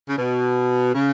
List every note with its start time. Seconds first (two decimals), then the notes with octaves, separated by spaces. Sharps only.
0.09 C#3
0.18 B2
0.95 C#3